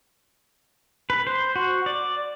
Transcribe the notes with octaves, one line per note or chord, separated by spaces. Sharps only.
B4
C5
F#4
D5